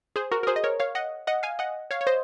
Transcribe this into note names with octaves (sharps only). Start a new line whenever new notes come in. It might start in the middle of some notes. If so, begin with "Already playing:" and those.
G#4 C5
F#4 A#4
A#4
G#4 C5
D#5
A#4 C#5
C#5 F5
D#5 F#5
D#5 F#5
F5 G#5
D#5 F#5
C#5 F5
C#5
C5 D#5